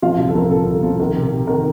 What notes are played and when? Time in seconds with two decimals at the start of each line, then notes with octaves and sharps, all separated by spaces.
0.02 F3 F4 F5
0.18 C2
0.29 A4
0.35 F3 A#4
0.50 C2 A4
0.67 C2
0.83 F3
1.00 D#3 A#4
1.15 C3
1.32 C3
1.47 D#3 A#4